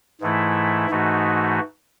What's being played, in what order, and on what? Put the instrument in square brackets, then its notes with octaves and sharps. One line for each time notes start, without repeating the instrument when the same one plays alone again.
[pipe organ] G#2 E3 A3 E4
G#2 E3 A3 D#4 F#4